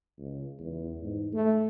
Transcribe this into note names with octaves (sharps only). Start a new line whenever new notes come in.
C#2
E2
G#2
A3